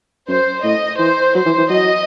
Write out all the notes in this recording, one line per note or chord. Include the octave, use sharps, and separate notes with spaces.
F#2 C5
A2 D#5
E3 C5
F#3 C5
E3
E3
F#3 D#5